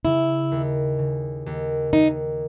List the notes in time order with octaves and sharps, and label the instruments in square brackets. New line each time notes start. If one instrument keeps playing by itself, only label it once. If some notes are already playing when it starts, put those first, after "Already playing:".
[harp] C#3 [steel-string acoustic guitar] E4
[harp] D#2
C#3
D#2
[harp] D#2 [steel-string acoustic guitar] D#4